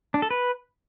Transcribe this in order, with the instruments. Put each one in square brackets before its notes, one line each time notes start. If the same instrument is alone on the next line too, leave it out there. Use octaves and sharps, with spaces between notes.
[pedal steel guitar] D4
A4
B4